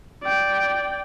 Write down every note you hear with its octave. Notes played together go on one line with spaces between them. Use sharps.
D5 G5